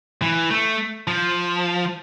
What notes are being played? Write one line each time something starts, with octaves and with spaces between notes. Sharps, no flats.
E3
A3
F3